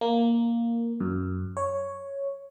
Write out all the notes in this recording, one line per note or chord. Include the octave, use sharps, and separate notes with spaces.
A#3
F#2
C#5